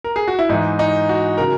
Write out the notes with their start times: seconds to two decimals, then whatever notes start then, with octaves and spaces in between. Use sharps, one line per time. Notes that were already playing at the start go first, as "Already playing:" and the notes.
0.04 A#4
0.16 G#4
0.28 F#4
0.39 E4
0.49 G#2 E3 D#4
0.79 D#4
1.09 F#4
1.38 C#3 F#3 A#4